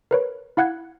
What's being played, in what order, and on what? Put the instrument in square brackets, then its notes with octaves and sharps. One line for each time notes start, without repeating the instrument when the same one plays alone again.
[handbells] A#4 B4 C#5
E4 F5 F#5 F#6 G#6